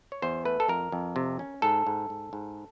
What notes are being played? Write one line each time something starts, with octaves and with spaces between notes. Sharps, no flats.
C#5
E2 C5
A3 B4
A4
F2 A#4
F2
C3
C#4
G#2 A4
G#2
G#2
G#2